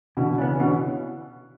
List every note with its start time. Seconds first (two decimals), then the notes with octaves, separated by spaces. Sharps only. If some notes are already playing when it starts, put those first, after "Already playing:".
0.17 B2 D3 E3
0.38 C#3 E3 B3 D4
0.56 C#3
0.60 B2 D3 E3